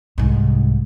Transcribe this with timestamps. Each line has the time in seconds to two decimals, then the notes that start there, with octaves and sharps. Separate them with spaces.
0.18 C2 G#2